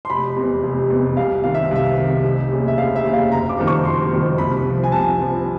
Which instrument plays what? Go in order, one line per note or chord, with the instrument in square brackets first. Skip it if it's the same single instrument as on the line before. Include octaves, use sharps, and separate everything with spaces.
[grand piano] C6
F1 B5
E2 C3
F1
E2 C3
C2 F5
C3 D#3 F5
E5
C2 E5
C3 D#3
F1
D#2 C#3
E5
F1 F5
E5
D#2 C#3
F5
F#1 A#5
D6
F2 C3 D#3 G3
C#6
F#1 C6
F2 C3 D#3 G3
C2 B5
C3 F3
G#5
C2 A5
C3 F3